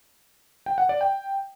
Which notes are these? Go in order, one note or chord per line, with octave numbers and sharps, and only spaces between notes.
G5
F#5
D5
G5